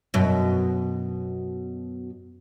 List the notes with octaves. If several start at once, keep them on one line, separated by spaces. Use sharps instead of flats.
F#2 B2